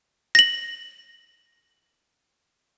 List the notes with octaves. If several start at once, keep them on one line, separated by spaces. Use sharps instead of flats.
A#6 F#7